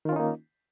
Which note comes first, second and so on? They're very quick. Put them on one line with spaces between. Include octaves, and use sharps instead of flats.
D#3 F4 C#4 D#4 A#3